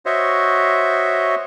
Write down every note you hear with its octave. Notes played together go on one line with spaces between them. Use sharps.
F#4 C5 C#5 D#5 E5